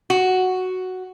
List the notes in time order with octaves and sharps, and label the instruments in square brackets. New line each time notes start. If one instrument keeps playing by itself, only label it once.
[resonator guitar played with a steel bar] F#4